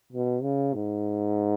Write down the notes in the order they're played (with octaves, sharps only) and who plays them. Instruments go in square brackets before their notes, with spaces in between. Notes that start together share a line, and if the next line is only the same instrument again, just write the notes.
[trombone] B2
C#3
G#2